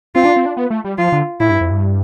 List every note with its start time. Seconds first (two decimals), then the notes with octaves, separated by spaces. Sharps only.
0.15 C4 F4
0.25 D4
0.36 C4
0.46 D4
0.57 B3
0.70 A3
0.85 G3
0.98 F3 F4
1.12 D3
1.40 A2 E4
1.50 G2
1.61 F2
1.71 G2